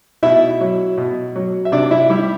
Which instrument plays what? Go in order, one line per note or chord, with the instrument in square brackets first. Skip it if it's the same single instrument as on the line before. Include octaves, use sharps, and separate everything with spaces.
[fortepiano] B2 E4 E5
F#3
B2
F#3
E5
C3 D4 D5
E4 E5
G3 E4 E5